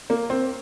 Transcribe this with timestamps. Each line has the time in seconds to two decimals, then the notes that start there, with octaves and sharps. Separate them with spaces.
0.10 A#3
0.30 C4